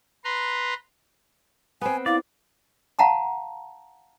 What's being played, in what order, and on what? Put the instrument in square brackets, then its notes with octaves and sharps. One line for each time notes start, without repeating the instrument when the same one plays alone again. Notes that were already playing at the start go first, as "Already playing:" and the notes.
[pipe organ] B4 A#5 C6
[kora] B3 C4 [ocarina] G#5
[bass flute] E4 [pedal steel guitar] D5 [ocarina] F5
[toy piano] F5 F#5 A5 A#5 C6